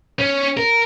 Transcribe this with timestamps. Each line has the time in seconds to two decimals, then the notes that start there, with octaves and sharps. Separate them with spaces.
0.19 C#4
0.57 A#4